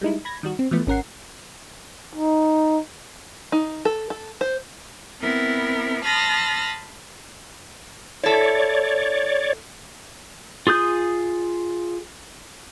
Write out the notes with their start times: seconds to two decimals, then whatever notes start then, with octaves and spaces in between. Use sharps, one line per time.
0.01 G3 G#3 D#4 E4
0.25 B5 G#6 A#6
0.43 D#3 G3 F#4
0.59 C4
0.71 E3 F3 A3 B3
0.87 G#1 C#4 A#4 F#5 C7
2.15 D#4
3.52 D#4
3.85 A4
4.10 A4
4.41 C5
5.20 B3 C4 E4 A#4
6.04 A5 B5 C6 D#6 F6 A#6
8.24 E4 A4 C#5 D5
10.67 F4 G#4 D#6 G6